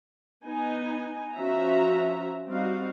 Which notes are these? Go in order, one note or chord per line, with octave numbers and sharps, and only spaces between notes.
B3 D#4 G#5
F3 C#4 F#4 E5 A#5
G3 C4 D#4 F#4 F5